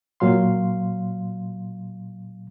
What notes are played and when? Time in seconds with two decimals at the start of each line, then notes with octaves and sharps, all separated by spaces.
0.20 A#2 F#3 F5 C6